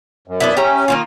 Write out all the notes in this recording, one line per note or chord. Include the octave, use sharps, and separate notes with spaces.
F#2
B3 D4 E4
C#4 G4 E5 A#5
D#3 A#3 F4